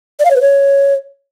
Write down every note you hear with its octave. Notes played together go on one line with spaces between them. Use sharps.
D5
F5
C#5
B4
C#5